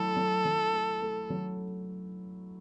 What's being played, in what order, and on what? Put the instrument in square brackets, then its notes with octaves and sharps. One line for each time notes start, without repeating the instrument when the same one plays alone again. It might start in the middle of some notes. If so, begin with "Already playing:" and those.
Already playing: [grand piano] F#3 A3 E4 [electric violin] A4
[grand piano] F#3
F#3
A3
A3
F#3